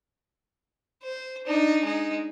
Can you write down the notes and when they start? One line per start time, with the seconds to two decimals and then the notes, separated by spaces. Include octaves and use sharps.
1.03 C5
1.46 D4 D#4
1.83 G#3 D#4